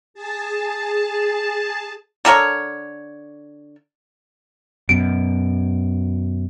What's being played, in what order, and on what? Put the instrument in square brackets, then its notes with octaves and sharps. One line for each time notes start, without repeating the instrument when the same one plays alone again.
[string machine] G#4 A5
[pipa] D3 A4 A#4 C#5
[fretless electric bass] F#2 B2 [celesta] D7